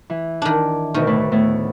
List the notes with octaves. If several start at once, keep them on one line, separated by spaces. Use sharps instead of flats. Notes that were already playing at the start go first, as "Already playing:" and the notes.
E3
D#3 D4
D2 B2 D#3 C#6
A2 B4
A2 B3